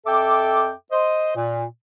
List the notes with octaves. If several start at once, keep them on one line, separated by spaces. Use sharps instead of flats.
F2 A4 E5 G5 D6
C5 D#5
A#2